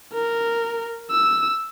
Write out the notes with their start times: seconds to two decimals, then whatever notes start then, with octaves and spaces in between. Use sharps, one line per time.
0.14 A#4
1.11 E6